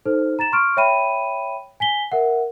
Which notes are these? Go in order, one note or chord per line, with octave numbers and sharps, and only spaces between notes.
D#4 A4 C5 F6
A#5 A6 E7
C6 C#6 F6 D7
C#5 E5 G5 B5 D#7
G#5 B6 G7
A#4 E5 F#5